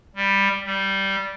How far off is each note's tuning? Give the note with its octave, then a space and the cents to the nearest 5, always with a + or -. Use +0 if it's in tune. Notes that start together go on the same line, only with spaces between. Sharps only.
G3 +10
G3 -10